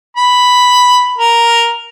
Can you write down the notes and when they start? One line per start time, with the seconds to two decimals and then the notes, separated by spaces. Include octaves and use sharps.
0.17 B5
1.18 A#4